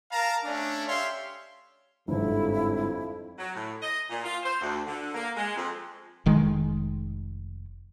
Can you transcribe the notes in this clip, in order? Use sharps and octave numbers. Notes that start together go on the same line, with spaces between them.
A#4 F5 A5 A#5
A3 C#4 D4
G4 C#5 E5 F5 C6
G1 F2 G#2 E4
F#3
A2
D#5
A#2
F4
C5
D2
D3
A#3
G#3
F2
F1 D#3 G#3